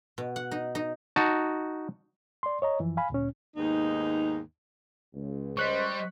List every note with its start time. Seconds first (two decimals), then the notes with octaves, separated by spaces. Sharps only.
0.18 B2
0.36 F#5
0.51 D#4
0.75 D#4
1.16 D#4 F#4 A5
2.43 D5 C6
2.62 C#5 D#5 A#5
2.80 F#2 E3 F3
2.97 F5 G#5 B5
3.10 D2 A#2 C#4
3.56 D#2 G#2 B3 D#4
5.14 C#2
5.57 G3 C5 D#5 C#6 F#6 B6